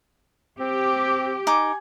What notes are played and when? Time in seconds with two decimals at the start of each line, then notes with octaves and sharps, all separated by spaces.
0.60 C4 G4
1.47 D#4 G#5 D6